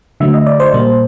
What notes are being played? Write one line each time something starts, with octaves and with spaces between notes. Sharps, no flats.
D3 F#3 A3 E5
D#5
D5
C5
A#2 G3 A#3